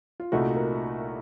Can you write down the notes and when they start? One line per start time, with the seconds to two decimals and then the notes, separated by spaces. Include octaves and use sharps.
0.20 F4
0.32 C2 A#2 A3 D#4 F#4
0.56 A#4